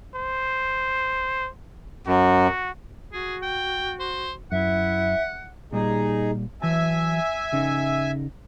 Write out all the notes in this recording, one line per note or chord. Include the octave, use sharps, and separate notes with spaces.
C5
F#2 F#4
F#4 G#4
G5
C5
F#2 E4 E5 F#5
A#2 G3 D#4 G#4
E3 F#3 E5 G#5 A5
C#3 C#4 D#4